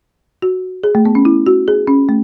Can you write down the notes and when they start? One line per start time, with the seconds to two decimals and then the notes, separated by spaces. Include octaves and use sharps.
0.42 F#4
0.84 G#4
0.95 A3
1.05 B3
1.15 C#4
1.25 E4
1.47 F#4
1.68 G#4
1.87 C#4
2.09 A3